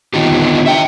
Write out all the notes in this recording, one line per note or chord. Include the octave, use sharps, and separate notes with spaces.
D3 D#3 B3 D#4 F4 G4
E5 G5